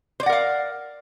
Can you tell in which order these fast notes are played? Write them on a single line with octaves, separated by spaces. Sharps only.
C5 D5 F#5 A#4 F5